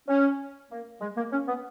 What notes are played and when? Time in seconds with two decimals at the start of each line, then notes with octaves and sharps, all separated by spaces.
0.08 C#4
0.71 A#3
1.01 G#3
1.17 A#3
1.32 C#4
1.48 B3